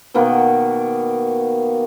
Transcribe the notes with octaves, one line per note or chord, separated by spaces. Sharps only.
B2 D#3 A#3 B3